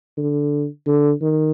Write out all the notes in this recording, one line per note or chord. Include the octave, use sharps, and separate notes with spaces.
D3
D3
D#3